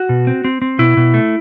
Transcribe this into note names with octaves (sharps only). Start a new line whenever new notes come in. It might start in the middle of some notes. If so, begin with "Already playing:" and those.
Already playing: F#4
B2
C4
C4
C4
B2 E4
B2
A3